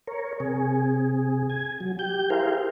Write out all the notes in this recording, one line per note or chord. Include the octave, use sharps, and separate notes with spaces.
A#4 C#5
C3 G#4
G#5
F#3
G4 G6
E4 G4 G#4 A#4 C5 F5